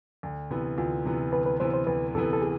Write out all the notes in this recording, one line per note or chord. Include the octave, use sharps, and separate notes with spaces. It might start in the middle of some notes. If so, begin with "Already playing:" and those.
D2
C3 E3 B3
D2 F4
C3 E3 B3
D2 B4
B4
C3 E3 B3 C5
C5
D2 B4
C3 E3 B3 A4
A4
G#4